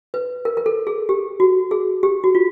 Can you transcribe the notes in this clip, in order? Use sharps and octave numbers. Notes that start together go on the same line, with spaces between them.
B4
A#4
A#4
A4
G#4
G4
F#4
G#4
G4
F#4
F4